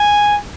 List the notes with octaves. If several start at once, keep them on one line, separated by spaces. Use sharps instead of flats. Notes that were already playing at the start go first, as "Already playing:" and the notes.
Already playing: G#5